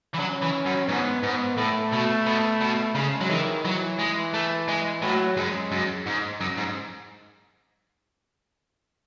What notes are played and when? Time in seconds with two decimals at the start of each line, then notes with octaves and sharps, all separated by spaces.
0.14 E3
0.19 F#3 C#4
0.42 E3
0.66 F#2
0.88 G#2 B3
1.23 G#2 B3
1.57 A2 A3
1.92 B2
2.26 B2
2.61 B2
2.95 C#3 G#3
3.21 F#3
3.30 D#3 E3
3.65 E3 F#3
3.99 G#3
4.34 A3
4.68 G#3
5.02 A2 F#3
5.36 F#2 G#3
5.72 F#2
6.06 G#2
6.41 F#2
6.58 G#2